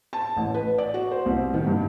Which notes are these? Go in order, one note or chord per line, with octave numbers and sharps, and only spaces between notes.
A5
A1
B4
D5
F#4
C5
C2
D#3
G2